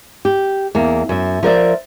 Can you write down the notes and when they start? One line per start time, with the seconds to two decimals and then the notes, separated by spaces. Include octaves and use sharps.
0.25 G4
0.75 E2 A#3
1.09 F#2 E5
1.43 F3 A#4 D5 E5